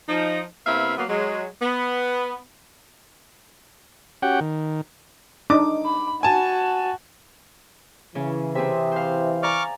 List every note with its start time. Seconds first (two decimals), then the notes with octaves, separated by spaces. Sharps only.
0.09 F3 D#4
0.67 C3 A#3 B3 E4 E5 F5
0.98 F#3 A#3 B3
1.09 F#3 G#3
1.62 B3
4.22 C#4 F#4 G4 F#5 G5
4.41 D#3
5.50 D4 D#4 D#5 D6
5.86 B5
6.23 F#4 G#5 A5
8.15 C#3 E3 C#4
8.55 C3 C4 G#4 E5
8.92 C5 F5
9.43 D5 G#5 A#5 C#6 D6 F6